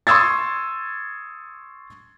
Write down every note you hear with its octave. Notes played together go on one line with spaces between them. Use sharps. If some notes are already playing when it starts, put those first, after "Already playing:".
C6 C#6 D#6 E6 G#6 A6